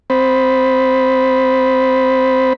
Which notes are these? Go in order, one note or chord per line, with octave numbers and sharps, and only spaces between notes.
C4 C5 B5